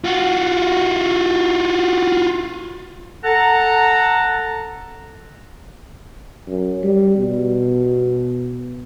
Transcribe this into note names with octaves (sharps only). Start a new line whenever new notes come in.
F4 F#4
A4 F#5 A5 A#5
F#2
G3
B2